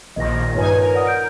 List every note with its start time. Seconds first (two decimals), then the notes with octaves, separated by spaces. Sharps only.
0.16 A#1 A#2 D#3 D#5 A#6
0.55 G2 D#4 F4 B4 C#5 G#5
0.78 A#4
0.94 D5 F#5 D#6
1.07 G6 D7